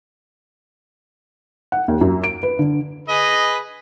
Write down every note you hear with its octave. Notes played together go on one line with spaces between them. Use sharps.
F#5
D#2
F#2
D7
B4
D3
G#4 B4 D#5